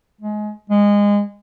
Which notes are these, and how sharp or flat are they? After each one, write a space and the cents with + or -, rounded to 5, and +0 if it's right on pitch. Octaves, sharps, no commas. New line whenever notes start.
G#3 +25
G#3 -20